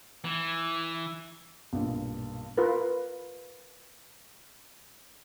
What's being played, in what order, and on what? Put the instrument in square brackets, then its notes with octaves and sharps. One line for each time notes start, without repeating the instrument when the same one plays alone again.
[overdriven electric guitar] E3
[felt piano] B1 G2 A#2
[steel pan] F4 A#4 B4